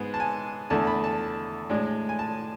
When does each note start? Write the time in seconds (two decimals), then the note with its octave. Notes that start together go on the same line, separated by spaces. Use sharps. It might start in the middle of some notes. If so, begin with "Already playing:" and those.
Already playing: G#2 G#3 B3
0.14 A5
0.20 G#5
0.70 E2 D3 A3 A5
0.87 B5
1.04 A5
1.70 A2 G#3 D4
2.09 G#5
2.19 A5